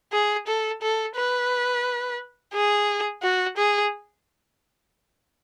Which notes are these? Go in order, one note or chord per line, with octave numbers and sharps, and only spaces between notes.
G#4
A4
A4
B4
G#4
F#4
G#4